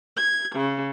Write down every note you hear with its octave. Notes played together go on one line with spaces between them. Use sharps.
G#6
C#3